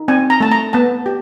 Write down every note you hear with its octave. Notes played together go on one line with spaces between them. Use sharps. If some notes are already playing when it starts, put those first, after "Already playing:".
Already playing: D#4
C4 G#5
A#5
A3 A5
A#5
B3 A5
G4